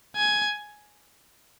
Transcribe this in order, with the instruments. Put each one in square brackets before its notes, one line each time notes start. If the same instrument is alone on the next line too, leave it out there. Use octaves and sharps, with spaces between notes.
[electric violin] G#5